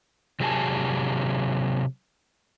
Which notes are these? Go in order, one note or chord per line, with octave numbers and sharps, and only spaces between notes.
C3 F#3 G4 G#4 G#5 A5